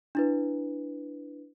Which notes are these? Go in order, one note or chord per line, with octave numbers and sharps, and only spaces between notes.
D4 E4 B4